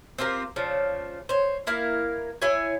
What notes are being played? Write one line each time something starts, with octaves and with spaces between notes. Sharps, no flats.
C4 F4 G4 A#4
C#3 F3 D4
C5 C#5
A#3 E4 A#4 F5
E4 G#4 C#5 G#5